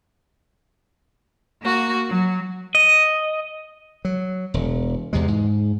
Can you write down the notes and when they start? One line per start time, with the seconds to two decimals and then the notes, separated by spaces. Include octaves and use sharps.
1.61 A#3 F#4
2.09 F#3
2.75 D#5
4.05 F#3
4.54 E1
5.13 E2 C3 G#3
5.28 G#2